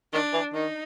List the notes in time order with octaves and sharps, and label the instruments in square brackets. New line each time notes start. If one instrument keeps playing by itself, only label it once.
[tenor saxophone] D#3 [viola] D4
[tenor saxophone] E3
[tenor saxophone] D#3 [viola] D#4